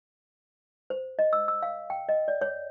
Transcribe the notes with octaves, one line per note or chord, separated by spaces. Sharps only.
C5
D#5
E6
E6
F5
G5
D#5
D5
C#5